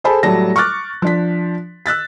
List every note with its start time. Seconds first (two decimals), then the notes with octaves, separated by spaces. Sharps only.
0.04 G#4 A4 C5 G#5 A5 B5
0.23 A2 F#3 G3 A3 A5 A#6
0.56 C#6 D6 F6 F#6 A6
1.02 F3 D4 B6
1.86 E6 F#6 A6 B6